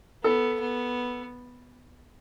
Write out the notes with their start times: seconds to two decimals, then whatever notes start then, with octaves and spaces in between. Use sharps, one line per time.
0.24 B3 A4
0.60 B3